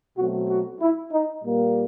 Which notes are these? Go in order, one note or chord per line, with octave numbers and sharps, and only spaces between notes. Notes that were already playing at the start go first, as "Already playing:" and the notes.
B2 F#3 A3 C4 F#4
F#4
E4
D#4
A#2 G3 A#3